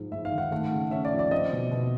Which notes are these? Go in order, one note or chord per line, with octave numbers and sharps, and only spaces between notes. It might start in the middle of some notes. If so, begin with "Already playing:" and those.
Already playing: G#2 F3 G#3
G#2 E5
F5
D#3
F#5
A3 F#5
C#3
C#4 E5
D5
F3
D5
C4 D#5
B2
B2